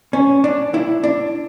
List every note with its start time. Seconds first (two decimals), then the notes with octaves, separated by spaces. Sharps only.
0.13 C#4
0.44 D4
0.74 E4
1.04 D4